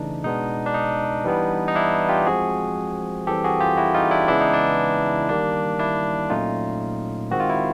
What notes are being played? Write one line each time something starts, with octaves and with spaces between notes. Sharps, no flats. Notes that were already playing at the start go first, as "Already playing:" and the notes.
Already playing: C#3 E3 A3 D4 D#4
B2 G#3 B3 D4 D#4
D4
D#4
E3 G3 B3 D4
D#4
D4 E4
F4 G4
F3 G#3 C4 F#4 G#4
E3 G3 C4 G4 A4
F#4 G#4
F4 G4
E4 F#4
D#4 F4
D4 E4
C#3 E3 G#3 B3 D4 E4
D#4
D4
D#3 G3 A#3 D4
D4 E4
A#2 F#3 A3 C#4 D#4 F4
D#3 G#3 C4 F#4
F4
E4